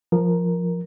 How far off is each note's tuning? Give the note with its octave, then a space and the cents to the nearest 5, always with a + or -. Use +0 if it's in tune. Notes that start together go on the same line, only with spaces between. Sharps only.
F3 +0 A#4 +5